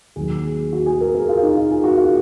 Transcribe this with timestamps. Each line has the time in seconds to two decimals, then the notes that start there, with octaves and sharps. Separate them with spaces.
0.16 D#2 D#3 F#3 G#4
0.73 F#4
0.86 G#4
1.01 A#4
1.15 A#4
1.29 F4
1.43 D#4
1.57 F4
1.71 G#4
1.84 F#4
1.97 F4